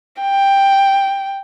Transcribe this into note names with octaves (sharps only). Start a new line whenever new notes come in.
G5